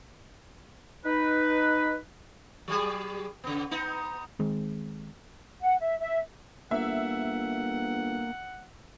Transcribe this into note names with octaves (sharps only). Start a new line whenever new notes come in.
D#4 B4
F#3 G3 G#4
C#3 B3
B3 D#4
D#3 G#3 C4
F#5
E5
E5
G1 A#3 E5 F#5